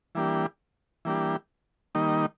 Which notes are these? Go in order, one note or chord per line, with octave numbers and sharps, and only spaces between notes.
E3 G3 A#3 D4 G4
E3 G3 A#3 D4 G4
D#3 G3 A#3 D#4